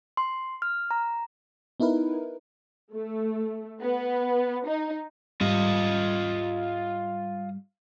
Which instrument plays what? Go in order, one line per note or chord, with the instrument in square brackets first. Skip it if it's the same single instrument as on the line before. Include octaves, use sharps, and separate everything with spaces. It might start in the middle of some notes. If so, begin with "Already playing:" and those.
[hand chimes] C6
F6
A#5
[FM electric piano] B3 D#4 E4 A#4 B4
[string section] A3
B3
D#4
[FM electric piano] G#2 G3 [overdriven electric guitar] F4 D#5